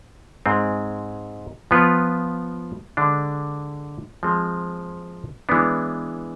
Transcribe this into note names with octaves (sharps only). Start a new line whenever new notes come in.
G#2 G#3 C4 G#4
F3 B3 F4 B4
D3 G#3 D4
F3 G#3 C4 G#4
E3 G#3 B3 D4